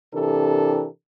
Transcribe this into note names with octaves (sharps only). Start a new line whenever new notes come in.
C3 E3 D4 G4 A4 A#4